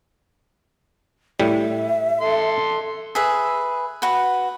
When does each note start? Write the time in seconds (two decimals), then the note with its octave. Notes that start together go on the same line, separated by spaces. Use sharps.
1.40 A2 G3 E5
2.21 A4 C6
3.15 G#4 B4 E5
4.02 F#4 B4